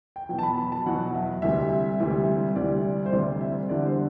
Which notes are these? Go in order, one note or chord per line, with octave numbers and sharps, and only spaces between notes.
G5
E2 B2 F#3 G5
A5
B5
B5
A5
E2 B2 F#3 F#5
E5
D2 C3 E3 G3 E5
D2 C3 E3 G3
D2 C3 E3 G3 D5
C5
D2 C3 E3 G3 D5
E5
E2 D3 G3 D5
C5